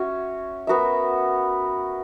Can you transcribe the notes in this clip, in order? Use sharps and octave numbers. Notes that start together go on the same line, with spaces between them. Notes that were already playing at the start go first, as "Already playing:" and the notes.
Already playing: C#4 F#4 C#5 E5
B3 F#4 A#4 E5